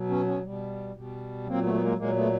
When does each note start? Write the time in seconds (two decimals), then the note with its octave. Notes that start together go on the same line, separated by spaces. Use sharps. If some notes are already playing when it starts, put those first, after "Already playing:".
Already playing: B2 F#3
0.09 B3 C#4
0.26 B3 C#4
0.44 B2 G3
0.96 B2 G3
1.47 A#2 F#3 A#3 C4
1.64 A3 B3
1.74 B3
1.81 G#3 A#3
1.98 A#2 F#3 G#3 A#3
2.16 A3 B3